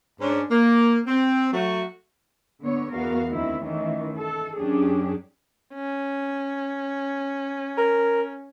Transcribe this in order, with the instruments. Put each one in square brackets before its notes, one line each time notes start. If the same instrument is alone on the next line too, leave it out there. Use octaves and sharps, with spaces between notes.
[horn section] G#2 C#4 D4
A#3
C4
F#3 A3 F#4
[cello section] D3 B3 C#5
E2 B3 F#4 A#4 F5
D2 D#3 C4 E4
D#3 E3 A3 C#4
A4
F#2 C#4 D4 G4 G#4
[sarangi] C#4
[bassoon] A#4